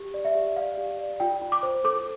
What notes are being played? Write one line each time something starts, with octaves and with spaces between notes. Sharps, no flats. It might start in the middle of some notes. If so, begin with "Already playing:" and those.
Already playing: G4
D5
E5
G4
D5 F5
G4
D5
F4 G5
F4
D6
C5
A4 D6